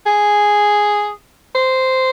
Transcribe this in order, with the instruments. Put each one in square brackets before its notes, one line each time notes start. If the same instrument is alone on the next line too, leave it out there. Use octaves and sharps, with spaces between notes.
[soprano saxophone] G#4
C5